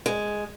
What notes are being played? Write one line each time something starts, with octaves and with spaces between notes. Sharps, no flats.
G#3